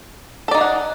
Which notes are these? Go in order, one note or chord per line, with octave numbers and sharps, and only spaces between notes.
D#4 G#4 A4 D5 F#5